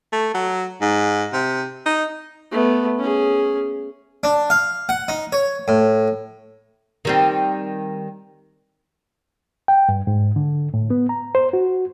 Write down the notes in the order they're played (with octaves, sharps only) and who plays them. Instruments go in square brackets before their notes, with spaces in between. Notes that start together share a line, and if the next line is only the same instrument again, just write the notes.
[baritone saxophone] A3
F#3
G#2
C3
D#4
[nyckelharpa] A3 B3
C#4 G#4
[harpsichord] D4
F5
F#5
D#4
C#5
A2
[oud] D#3 G3 C4
[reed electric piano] G5
G2
G#2
D3
A2
B3
A#5
C5
F#4